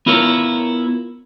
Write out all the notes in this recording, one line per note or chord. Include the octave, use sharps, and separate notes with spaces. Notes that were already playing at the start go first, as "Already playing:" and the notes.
B3 E4 F4 A#4 C#5